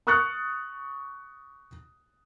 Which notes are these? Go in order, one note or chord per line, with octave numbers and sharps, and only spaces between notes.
C#6 D#6 F6 F#6 A6 C#7